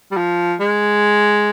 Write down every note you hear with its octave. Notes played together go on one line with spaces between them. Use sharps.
G3
F3
G#3